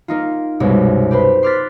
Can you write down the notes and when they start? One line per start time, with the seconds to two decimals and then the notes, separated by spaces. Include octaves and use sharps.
0.08 A#3 D#4 F4
0.60 C2 F#2 B2 G#3
1.11 G4 B4 C5 B5
1.43 C6 D6 F6 F#6 A6 B6